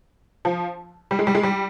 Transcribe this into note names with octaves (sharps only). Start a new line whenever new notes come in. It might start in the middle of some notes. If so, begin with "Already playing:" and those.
F3
G3
G#3
G3
G#3
G3